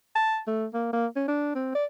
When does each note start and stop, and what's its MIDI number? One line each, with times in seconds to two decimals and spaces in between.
0.16 0.40 81
0.48 0.67 57
0.74 0.92 58
0.93 1.07 58
1.16 1.26 61
1.28 1.54 62
1.55 1.74 60
1.75 1.86 74